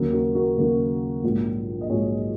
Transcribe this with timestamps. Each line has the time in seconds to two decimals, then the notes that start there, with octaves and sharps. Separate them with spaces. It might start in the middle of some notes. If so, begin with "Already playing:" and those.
Already playing: D#2 C#3 F#3 A#3
0.13 F#4 A#4
0.35 F#4 A#4
0.57 D#2 C#3 F#3 A#3
1.24 A#1 G#2 F#3
1.81 D#5
1.90 A#1 G#2 F#3 G#4 C#5